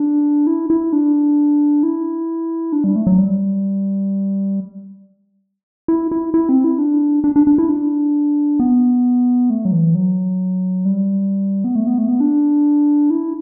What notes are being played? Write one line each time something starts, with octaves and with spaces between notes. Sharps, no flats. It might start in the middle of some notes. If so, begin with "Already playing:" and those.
Already playing: D4
E4
E4
D4
E4
D4
G3
A3
F#3
G3
E4
E4
E4
C4
E4
D4
D4
D4
D4
E4
D4
B3
A3
F#3
E3
F#3
G3
B3
A3
B3
A3
B3
D4
E4